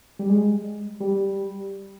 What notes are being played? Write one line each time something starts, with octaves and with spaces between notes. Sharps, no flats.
G3
G#3
G3